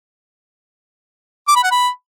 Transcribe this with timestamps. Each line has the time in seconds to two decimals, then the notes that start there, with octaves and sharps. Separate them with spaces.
1.48 D6
1.56 B5
1.63 F#5
1.71 B5